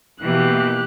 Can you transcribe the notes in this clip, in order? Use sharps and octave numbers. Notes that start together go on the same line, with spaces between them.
B2 E3 A#3 G4 F#6